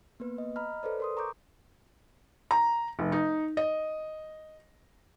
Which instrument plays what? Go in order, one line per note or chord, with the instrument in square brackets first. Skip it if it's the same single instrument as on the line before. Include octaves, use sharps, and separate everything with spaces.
[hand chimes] A#3 B3 B4
D#5
D#5 A#5 B5 F6
A4 B4 C5 D5
A#4 C6 D#6
A#5 C#6 D6 G6
[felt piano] A#5
F1
D#4
D#5